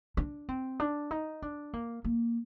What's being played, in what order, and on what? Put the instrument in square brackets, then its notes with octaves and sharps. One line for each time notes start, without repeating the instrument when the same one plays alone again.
[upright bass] D4
C4
D4
D#4
D4
A#3
A#3